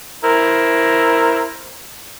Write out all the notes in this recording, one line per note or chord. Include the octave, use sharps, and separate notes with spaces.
E4 A#4 C5